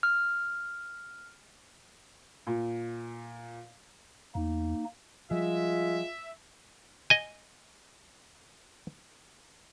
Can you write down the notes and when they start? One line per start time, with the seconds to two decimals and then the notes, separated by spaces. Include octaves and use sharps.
0.03 F6
2.47 A#2
4.35 E2 A#3 D#4
5.31 F3 G3 G#3 F4 E5
7.10 D#5 G#5